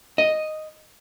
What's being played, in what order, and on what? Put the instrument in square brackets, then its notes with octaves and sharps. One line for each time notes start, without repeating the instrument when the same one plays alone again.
[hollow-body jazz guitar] D#5